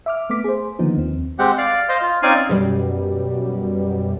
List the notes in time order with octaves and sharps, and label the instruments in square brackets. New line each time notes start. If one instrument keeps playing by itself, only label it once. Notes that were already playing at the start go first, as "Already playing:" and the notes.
[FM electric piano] E5 D6 F6
A3 B3 D6 B6
G#4 C5
D3 D#3 F3 A#3 B3 D#4
D#2 C4
[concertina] G#3 C4 G4 F#5
D5 F5
C5 D#5 F5
F4
C4 C#4 D#4 D5 F5 G#5
[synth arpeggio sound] F#2 B2 G3